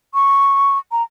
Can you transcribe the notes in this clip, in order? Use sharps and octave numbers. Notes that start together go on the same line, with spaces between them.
C#6
A#5